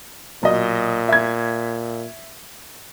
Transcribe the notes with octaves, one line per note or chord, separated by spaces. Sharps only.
B1 A#2 D#5
E5 G#6